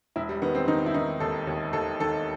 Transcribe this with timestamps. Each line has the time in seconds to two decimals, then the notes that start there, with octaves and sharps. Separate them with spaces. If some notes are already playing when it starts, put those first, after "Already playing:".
0.16 E1 E4
0.29 G3
0.42 D#3 B3
0.55 C4
0.68 D#3 D#4
0.86 E4
0.94 D#3 D#4
1.20 D#2 A4
1.47 D#2
1.73 D#2 A4
2.00 D#3 A4